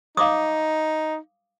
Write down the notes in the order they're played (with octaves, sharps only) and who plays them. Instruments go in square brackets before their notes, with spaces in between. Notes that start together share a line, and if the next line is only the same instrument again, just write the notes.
[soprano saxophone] D#4 [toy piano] F5 D6 D#6